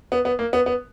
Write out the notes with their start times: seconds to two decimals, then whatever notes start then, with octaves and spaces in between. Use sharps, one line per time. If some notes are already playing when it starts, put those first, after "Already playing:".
0.12 B3
0.25 B3
0.39 A#3
0.53 B3
0.66 B3